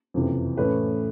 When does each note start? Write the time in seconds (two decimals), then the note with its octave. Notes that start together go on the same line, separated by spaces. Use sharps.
0.14 F#1 F2 C3 E3
0.57 A2 E3 A3 C#4 B4